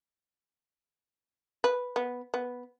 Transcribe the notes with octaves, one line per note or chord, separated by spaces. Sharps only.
B4
B3
B3